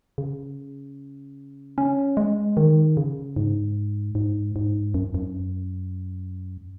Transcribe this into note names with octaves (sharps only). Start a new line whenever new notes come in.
C#3
C#4
G#3
D#3
C#3
G#2
G#2
G#2
F#2
F#2